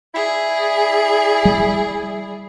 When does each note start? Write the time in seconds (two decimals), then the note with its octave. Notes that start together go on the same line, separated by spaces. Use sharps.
0.14 E4 G#4 D5
1.45 G3